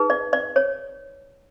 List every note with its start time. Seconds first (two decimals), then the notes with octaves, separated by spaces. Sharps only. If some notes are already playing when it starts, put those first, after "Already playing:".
Already playing: D#4 G#4 B4
0.10 D5
0.33 D5
0.56 C#5